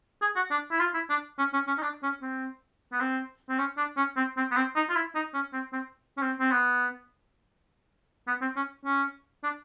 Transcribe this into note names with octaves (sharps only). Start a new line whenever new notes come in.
G#4
F#4
D4
E4
F4
E4
D4
C#4
C#4
C#4
D#4
D4
C#4
C4
B3
C4
C4
C#4
D4
C#4
C4
C4
B3
C4
D#4
F4
E4
D#4
C#4
C4
C4
C#4
C4
C4
B3
B3
C4
C#4
C#4
D4